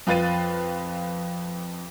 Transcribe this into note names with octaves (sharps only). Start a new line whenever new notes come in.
F2 F4 B4 F5 A6 D#7